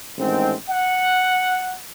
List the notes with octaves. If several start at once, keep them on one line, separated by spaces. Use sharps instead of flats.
A1 G#2 D#3 G#3 C4
F#5